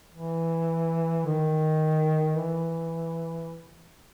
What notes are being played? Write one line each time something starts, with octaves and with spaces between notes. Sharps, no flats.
E3
D#3
E3